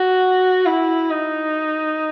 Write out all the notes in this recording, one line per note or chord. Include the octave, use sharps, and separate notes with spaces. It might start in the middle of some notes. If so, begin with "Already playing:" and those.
Already playing: F#4
E4
D#4